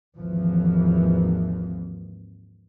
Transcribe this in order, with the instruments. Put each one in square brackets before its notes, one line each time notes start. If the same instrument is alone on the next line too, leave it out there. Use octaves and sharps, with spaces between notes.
[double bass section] G#1 D#2 E3 F3